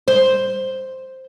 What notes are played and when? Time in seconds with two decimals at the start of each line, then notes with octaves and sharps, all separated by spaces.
0.08 C5